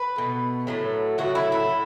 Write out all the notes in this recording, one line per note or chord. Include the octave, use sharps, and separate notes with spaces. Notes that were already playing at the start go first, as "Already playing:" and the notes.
Already playing: B4
B2 A3
A2 F#3 A3
A2 F#3 A3 F#4
E4
E4
A2